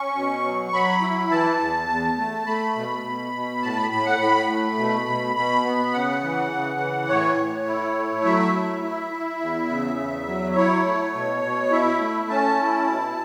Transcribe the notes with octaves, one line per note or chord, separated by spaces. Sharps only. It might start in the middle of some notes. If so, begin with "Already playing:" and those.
Already playing: C#4 C#6
B2
F#3
F#3 B5
E4
E3 A5
E2
E2
A3
A3 B5
B2
B2
B2
A2 A5
B5
A2 B5
F#5
A2 B5
A3
B2
B2
B2 B5
B3
C#3 F#5
E3
C#3
E3
A2 C#5
A2
E4
A3
F#3 E5
E4
E4
E4
E2
C#3
E2
F#3
E5
E4 C#5
A3
B2
B2
E4 E5
A3
C#4 A5
E4
B2